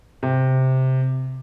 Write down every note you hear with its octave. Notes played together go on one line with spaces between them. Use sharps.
C3